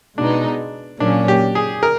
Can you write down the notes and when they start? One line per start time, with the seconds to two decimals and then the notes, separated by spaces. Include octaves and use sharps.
0.18 B2 G#3 B3 D4 D#4
1.00 A#2 F#3 A#3 C#4 D4
1.28 G4
1.55 G#4
1.83 A#4